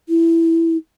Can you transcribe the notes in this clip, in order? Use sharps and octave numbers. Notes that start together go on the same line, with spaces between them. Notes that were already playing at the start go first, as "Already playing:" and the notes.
E4